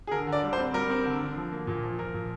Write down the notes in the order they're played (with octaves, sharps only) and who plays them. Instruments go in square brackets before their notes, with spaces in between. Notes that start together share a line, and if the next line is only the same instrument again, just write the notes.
[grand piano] G#4
D3 A#4
D3
D5
G3
C5
C4
G3 A#4
C4
D3
D3
F3
A#3
A#2
F3
F3 A#4
A#2